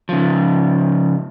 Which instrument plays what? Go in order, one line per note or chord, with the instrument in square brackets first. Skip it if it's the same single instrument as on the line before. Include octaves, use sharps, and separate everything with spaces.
[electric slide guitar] C#3 F3